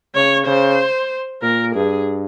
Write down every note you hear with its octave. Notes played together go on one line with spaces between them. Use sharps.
C#3 C#5
C#3 C5
A#2 A#4
G2 G#4